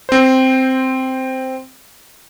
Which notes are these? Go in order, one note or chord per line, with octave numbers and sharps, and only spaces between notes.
C4 C5